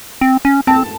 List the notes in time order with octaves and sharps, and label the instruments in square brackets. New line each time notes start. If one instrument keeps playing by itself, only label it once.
[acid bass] C4
C#4
[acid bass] C4 [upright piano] A5